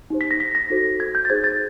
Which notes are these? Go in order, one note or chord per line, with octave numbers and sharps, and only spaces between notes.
D#4 G4 C5
B6
A#6
B6
A#6
D#4 F#4 A4 C5
G#6
G6
A6
D#4 G#4 C5 G#6
A6